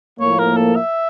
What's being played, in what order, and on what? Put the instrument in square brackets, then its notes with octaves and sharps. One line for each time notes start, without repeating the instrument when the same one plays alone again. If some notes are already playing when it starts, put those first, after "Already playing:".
[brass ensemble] A2 F3 A#3 [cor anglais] C#5
[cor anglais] A#4
A4
E5